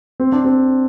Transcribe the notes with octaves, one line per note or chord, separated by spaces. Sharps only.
C4
D4
C4